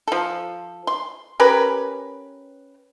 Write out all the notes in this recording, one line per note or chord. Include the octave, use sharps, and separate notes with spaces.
F3 A4
C6
C#4 G4 A#4 B4